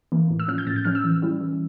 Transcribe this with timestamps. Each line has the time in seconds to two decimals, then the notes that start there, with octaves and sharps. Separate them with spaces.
0.12 E3 A#3
0.30 A2
0.40 E6
0.48 F3 C#4 F6
0.58 G6
0.67 A2 A6
0.76 G6
0.85 F3 C#4 F6
0.95 E6
1.04 E3
1.22 G3 C#4 E4
1.41 E3